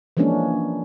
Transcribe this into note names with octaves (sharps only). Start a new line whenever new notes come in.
E3 F3 G#3 A#3 C#4 D4